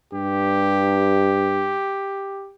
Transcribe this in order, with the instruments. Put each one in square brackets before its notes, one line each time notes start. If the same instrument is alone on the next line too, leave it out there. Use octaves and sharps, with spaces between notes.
[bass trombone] G2 [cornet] G4